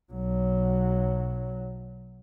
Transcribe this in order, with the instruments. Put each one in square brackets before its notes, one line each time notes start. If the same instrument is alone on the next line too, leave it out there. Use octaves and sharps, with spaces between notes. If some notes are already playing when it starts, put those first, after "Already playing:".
[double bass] B1 F#3